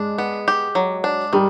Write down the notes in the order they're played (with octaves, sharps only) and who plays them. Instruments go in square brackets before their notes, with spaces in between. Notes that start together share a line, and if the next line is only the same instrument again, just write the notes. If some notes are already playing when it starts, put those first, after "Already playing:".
Already playing: [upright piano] G#3 [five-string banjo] D4
[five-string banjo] B3
G4
F#3
D4
[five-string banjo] D#3 [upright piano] G3